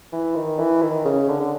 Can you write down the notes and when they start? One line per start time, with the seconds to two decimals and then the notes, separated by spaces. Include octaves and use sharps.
0.13 E3
0.36 D#3
0.59 E3
0.82 D#3
1.05 C#3
1.29 D3
1.41 D3